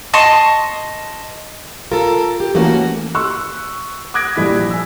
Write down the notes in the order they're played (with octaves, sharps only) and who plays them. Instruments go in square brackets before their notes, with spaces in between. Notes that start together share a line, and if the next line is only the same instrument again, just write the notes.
[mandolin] D#5 A5 C6 C#6
[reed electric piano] F4 [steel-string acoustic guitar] A4 A#4
[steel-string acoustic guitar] G4
[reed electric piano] E3 A#3 C#4 [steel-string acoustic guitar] A3 F#4
[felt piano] C6 C#6 E6 F#6
D6 D#6 F#6 G#6 A#6 D7
A#1 G3 E4 B6
G#5 E6